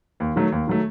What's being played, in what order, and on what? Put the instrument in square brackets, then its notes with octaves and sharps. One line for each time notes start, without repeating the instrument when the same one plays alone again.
[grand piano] D#2
D#3 F#3 A3
D#2
D#3 F#3 A3